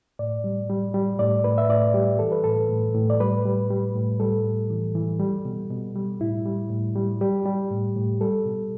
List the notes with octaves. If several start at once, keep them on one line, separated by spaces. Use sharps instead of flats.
A2 D5
G3
G3
G3
A2 D5
A2 B4
E5
A2 D5
G3 G4
E3 A4
B4
A2 A4
A2
A2
D5
G3 B4
G3
G3
A2
G3 A4
A2
E3
E3
G3
B2
B2
G3
A2 E4
G3
A2
G3
G3 G4
G3
A2
A2
G3 A4
B2